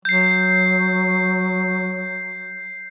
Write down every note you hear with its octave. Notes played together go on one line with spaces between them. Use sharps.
F#3 G6 C7